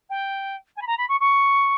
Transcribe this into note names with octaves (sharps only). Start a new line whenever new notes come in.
G5
G#5
B5
A#5
B5
C#6
C#6